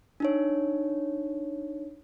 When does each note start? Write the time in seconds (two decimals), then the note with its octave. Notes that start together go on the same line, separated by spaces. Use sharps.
0.20 D4 D#4 C#5